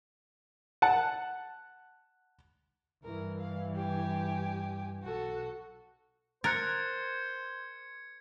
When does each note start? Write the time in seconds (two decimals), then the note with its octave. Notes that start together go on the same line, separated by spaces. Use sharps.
0.82 F#5 A5
3.04 G2 E3 A#4
3.40 F5
3.75 G4 G#5
5.03 B1 F#4 A4
6.44 A#4 C5 F#6 G#6 A6 C#7